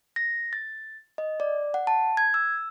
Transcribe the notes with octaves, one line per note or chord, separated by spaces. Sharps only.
A#6
A6
D#5
D5
F#5
A5
G#6
E6